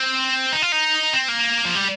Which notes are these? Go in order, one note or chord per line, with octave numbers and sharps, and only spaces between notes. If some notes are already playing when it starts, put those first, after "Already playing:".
Already playing: C4
D#4
F4
D#4
C4
A#3
F3
G3